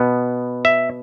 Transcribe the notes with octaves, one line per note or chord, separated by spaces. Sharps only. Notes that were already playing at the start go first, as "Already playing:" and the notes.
Already playing: B2 B3
E5